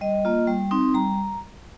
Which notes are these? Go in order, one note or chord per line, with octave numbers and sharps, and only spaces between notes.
G3 D#5
A#3 F4
G3
C4 D#4
G3 A#5